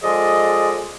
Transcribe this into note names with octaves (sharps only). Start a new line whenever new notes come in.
F3 G#3 G#4 A4 D5 D#5